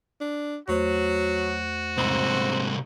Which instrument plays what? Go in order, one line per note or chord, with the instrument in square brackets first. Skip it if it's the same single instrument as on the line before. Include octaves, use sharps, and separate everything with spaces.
[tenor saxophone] D4
[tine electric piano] E2 A3 C5 [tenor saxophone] F#3 [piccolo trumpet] F#4
[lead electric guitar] C2 G#2 [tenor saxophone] C4